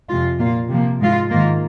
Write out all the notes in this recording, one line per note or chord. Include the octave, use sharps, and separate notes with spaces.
F2 C3 G#3 F4
A#2 A#3 F4
C3 F3 A#3
G#2 G#3 F4
G#2 D#3 A#3 F4